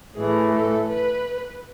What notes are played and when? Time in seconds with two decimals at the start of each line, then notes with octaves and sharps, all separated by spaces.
0.15 A2 E3 A3 G#4
0.52 A4
0.90 B4